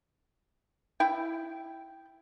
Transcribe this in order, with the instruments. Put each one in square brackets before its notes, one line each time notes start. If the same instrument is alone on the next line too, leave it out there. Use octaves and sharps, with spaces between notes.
[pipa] E4 G5